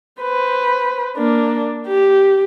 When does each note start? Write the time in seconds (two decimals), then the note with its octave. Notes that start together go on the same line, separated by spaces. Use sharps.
0.21 B4 C5
1.17 A#3 D4
1.87 G4